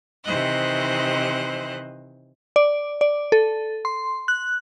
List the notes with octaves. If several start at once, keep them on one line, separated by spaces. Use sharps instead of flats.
C3 D#3 E3 C5 D#5 F#6
D5
D5
A4
C6
F#6